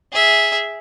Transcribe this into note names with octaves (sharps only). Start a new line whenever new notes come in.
G#4 E5